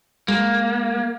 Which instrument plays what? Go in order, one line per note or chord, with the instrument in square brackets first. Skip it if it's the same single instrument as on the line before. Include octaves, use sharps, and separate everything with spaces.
[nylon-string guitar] G#3 [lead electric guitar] A#3